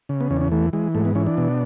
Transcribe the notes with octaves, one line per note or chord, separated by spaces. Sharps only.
C#3
B3
E2 C#4
D4
C#4
E3 A3
E3 G#3
G#2 A3
B3
E3 C#4
D4
B2